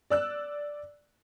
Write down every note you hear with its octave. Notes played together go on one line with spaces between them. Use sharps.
D5 E6 F#6